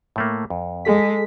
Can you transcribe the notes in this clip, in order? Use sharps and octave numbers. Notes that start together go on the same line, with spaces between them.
A2 A3 A#3
F2
G#3 G#4 A4 B6